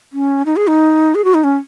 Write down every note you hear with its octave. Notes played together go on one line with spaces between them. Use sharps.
C#4
D#4
G#4
D#4
G#4
F#4
D#4
C#4